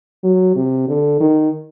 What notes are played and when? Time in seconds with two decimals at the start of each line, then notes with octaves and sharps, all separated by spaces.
0.23 F#3
0.55 C3
0.88 D3
1.20 D#3